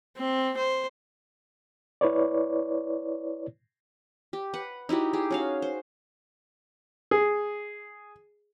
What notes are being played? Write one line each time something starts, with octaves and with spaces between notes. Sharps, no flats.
C4
C5
E4 B4 C#5 D5
G4
B4 F#5
D#4 E4 F#4 G4
G4 G#4
C#4 F#4 F5
C5
G#4